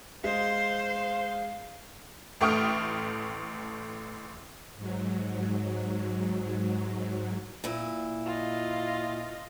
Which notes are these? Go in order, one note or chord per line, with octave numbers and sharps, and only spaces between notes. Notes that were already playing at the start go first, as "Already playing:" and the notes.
G#3 C5 F5
A1 A3 G5 C#6 D#6 F6
G#2 F#3
A#2 E4
F4 D#5